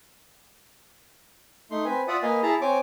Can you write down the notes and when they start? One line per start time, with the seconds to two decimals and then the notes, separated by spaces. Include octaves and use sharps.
1.71 A3 D#4 C6
1.85 C4 B4 G#5
2.08 F4 D5 E5 F#5 D#6
2.23 A#3 B4 D#5 F5 G#5
2.43 E4 G#4 A5 A#5
2.61 C4 C#5 G#5 D6